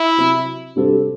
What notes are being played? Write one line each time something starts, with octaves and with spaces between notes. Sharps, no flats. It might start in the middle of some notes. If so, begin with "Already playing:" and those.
Already playing: E4
C3 F#3 C4
C3 G3 D4 A4 C5